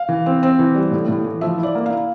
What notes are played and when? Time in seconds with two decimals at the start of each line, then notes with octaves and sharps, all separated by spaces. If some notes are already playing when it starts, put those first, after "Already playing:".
Already playing: F5
0.09 E3
0.26 C4
0.43 C4
0.59 E3
0.75 G3
0.91 A2
1.08 A2
1.24 E3
1.41 F3 E5
1.58 E4
1.63 D5
1.75 A#3
1.86 E4 F5